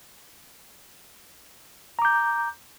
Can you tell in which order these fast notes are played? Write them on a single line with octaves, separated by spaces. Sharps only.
A#5 D6 G6